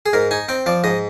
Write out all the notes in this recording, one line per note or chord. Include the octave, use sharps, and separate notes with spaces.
G#4
G#2 A#4
D#4 G#5
C4 G5
F3 D5
G#2 D#5